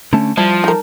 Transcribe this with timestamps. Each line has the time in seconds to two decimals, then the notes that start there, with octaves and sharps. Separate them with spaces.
0.13 D3 A3 C#4 A5
0.38 F3 G3 E4 A5
0.64 D#4 A#4